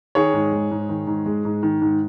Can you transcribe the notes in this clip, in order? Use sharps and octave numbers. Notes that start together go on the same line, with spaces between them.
D#3 G#4 C#5
G#2
G#3
G#2
D#3
G#2
G#3
G#2
D#3
G#2